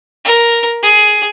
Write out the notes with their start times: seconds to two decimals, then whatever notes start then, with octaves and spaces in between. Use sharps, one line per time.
0.25 A#4
0.83 G#4